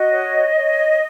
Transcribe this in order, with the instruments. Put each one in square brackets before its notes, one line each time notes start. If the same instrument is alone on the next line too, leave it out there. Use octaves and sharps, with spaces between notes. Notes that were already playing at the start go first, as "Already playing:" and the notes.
Already playing: [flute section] F#4 D#5
C#5
C#5